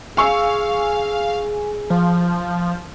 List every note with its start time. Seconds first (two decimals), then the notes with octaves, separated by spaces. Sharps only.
0.17 G#4 F5 G#5 C#6 E6
1.90 F3